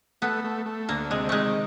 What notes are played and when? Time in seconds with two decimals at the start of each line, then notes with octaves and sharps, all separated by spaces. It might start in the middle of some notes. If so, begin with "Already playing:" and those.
0.22 A3 B3
0.44 A3
0.66 A3
0.89 D2 A#3
1.10 C3 G#3
1.29 D#3 G#3 A3